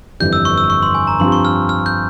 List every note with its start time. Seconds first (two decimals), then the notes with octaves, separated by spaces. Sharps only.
0.20 G1 F2 E3 G3 G6
0.33 E6
0.45 C#6
0.58 E6
0.70 C#6
0.83 C6
0.95 G#5
1.07 A#5
1.20 G2 F3 C4 G4 C6
1.32 C#6
1.45 F6
1.69 F6
1.86 G6